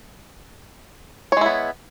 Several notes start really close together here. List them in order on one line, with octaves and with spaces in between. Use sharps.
C#5 G#3 E4 B3